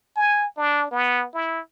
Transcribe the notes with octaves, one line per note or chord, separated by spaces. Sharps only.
G#5
D4
B3
E4